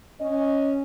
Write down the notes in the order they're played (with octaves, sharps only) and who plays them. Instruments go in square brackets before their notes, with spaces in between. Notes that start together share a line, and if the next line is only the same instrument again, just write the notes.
[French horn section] C#4 D#5